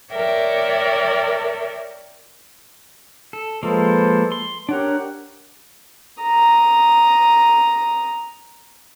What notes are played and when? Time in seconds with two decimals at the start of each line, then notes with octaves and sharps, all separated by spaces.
0.12 A#4 C#5 D5 E5 G5
3.33 A4
3.63 F3 G#3 A#3 A4 B4 C5
4.32 C6
4.69 D4 G4 A#4 C#5 F#5
6.22 A#5 D#6